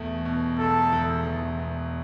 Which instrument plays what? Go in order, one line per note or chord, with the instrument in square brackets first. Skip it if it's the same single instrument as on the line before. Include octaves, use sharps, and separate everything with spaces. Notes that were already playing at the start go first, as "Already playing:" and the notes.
Already playing: [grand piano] E2 B2 A3
B2
[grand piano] E1 [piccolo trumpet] A4
[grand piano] E2
E2
B2